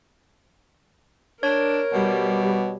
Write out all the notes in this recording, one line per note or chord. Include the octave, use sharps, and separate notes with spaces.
D4 A#4 C#5
B2 G3